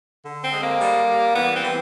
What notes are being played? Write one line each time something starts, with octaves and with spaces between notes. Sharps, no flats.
D3
C4
G#3
A#3
G3
G3
E3 B3
C4
E3